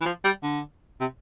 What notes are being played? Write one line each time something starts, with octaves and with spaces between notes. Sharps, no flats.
E3
F3
G3
D3
C3